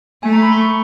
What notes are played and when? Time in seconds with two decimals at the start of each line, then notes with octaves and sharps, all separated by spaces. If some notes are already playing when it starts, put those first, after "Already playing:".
0.23 A3 G#5
0.33 A#5
0.42 B5
0.52 C6
0.61 C#6